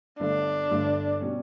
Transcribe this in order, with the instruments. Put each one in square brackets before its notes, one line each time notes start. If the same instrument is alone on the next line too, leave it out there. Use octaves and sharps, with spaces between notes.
[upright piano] G1 G2 D3 A3 [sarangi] D4
[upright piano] G1 G2 D3 A3
B2 G3 C#4